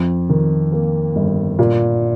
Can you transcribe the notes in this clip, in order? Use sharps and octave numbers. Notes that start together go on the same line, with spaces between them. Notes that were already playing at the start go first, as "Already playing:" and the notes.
Already playing: F2
D#3
A#3
G1
A#2